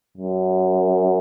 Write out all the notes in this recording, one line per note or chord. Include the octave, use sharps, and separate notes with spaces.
F#2